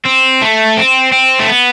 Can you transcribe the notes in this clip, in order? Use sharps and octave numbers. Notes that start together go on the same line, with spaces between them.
C4
A3
C4
C4
A3
B3